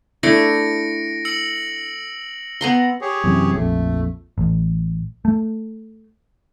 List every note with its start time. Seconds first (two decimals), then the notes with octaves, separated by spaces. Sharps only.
0.23 A3 D4 E4 A#6 C#7 D7
1.25 E6 C#7 F#7
2.61 B3 A#5 C6
3.01 G4 G#4 C#5
3.24 F#2 C3 E3
3.54 A#1 F2 A3
4.38 A1
5.25 A3